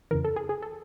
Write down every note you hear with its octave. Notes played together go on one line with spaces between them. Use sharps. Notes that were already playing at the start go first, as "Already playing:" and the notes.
F2 C#3 E3 A#4
A4
G#4
G#4
A4